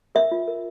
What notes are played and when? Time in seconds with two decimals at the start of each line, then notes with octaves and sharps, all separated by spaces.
0.15 A#4 E5
0.32 F4
0.48 A#4